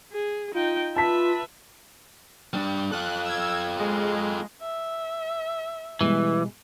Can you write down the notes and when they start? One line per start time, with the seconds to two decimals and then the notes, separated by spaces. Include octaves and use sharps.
0.12 G#4
0.55 D#4 F4 G5
0.97 B4 E5 A5 B6
2.53 G3 D4
2.91 F4 A4 F#6
3.25 E6 G#6
3.79 G#3
4.62 E5
6.01 B2 E3 G3 G#3